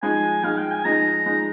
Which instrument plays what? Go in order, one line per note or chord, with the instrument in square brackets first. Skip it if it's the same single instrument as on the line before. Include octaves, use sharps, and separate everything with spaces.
[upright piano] F3 G#3 D#4 [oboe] G#5
[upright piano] F3 G#3 D#4 [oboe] F5
[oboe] G5
G#5
[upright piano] F3 G#3 D#4 [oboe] A#5
[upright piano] F3 G#3 D#4